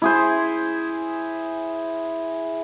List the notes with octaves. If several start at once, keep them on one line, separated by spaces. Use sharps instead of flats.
E4 G#4 C5